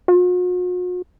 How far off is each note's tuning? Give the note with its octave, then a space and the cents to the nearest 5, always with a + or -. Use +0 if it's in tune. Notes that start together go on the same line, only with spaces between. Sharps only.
F#4 -45